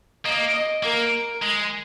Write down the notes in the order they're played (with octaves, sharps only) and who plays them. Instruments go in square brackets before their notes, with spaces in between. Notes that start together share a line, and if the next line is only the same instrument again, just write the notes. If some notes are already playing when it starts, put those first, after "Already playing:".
[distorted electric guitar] A#3 [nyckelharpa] D#5
[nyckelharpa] D#5
[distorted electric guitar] A#3 [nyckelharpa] A#4
[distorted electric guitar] G#3